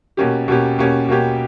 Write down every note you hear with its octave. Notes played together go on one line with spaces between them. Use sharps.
B2 A#3 C#4 G4
B2 A#3 C#4 G4
B2 A#3 C#4 G4
B2 A#3 C#4 G4